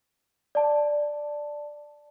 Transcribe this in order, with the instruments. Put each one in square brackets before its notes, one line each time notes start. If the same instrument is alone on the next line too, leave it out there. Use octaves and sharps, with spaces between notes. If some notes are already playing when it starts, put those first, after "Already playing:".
[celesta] D5 A5